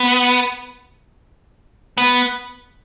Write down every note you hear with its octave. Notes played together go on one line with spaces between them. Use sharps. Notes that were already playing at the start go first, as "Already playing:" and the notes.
Already playing: B3
B3